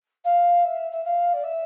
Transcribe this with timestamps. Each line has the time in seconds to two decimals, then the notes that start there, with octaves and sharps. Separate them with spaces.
0.24 F5
0.64 E5
0.92 E5
1.05 F5
1.33 D5
1.44 E5